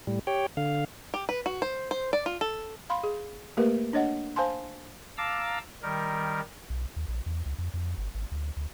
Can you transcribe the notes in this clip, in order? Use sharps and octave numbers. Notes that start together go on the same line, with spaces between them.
A2 G3
G4 C#5 G5
D3 F5
G4
B4
F#4
C5
C5
D5
F4
A4
F5 B5 C6
G#4
A3 A#3 G4 A#4 B4
D4 C#5 D#5 F#5
C5 F5 G#5 A5 C6
F5 A5 A#5 D6 E6
D#3 G3 A#4
B1
D#2
A#1
E2
C#2
F2
F2
G1
G#1
D2
D2